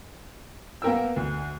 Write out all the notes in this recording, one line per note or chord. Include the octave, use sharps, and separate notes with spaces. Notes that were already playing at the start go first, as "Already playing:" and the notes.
A#3 B3 A#4 G5 E6
D2